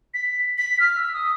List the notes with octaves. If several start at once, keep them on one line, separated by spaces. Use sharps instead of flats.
B6
B6
F6
E6
D#6